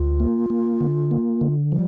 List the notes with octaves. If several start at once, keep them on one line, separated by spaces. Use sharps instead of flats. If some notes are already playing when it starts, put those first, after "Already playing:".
Already playing: D2 F4
A#3
A#3
D3
A#3
D3
F3 G3